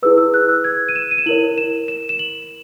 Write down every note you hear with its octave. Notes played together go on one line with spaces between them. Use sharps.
E4 G#4 B4 E6
E6
F#6
E6
G#6
D#7
E7
D#7
E7
E4 A#4 C#5 F#7
E7
E7
E7
F#7